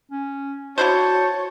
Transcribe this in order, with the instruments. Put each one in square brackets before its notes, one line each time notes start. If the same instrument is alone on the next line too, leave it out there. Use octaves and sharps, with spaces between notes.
[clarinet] C#4
[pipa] D3 E4 C5 [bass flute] F#4 [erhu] C#5 [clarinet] A5